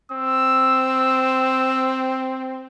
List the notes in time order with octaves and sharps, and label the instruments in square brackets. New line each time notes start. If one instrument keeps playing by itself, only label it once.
[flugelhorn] C4 [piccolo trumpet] E6